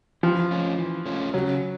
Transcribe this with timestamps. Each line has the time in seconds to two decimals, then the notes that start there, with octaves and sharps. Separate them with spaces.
0.23 E3 F3
0.51 A3 C#4 F4
0.78 E3
1.06 A3 C#4 F4
1.34 C#3 F#3